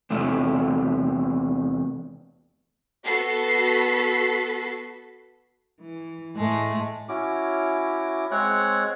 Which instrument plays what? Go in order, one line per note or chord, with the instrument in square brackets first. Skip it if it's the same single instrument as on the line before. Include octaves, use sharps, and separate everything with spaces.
[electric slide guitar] E2 C3 A3
[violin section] B3 F#4 A4 B6 C7
[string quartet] E3
A2 G#3 A3
[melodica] C#4 E4 F#4 D6
G#3 C4 C#5 F#5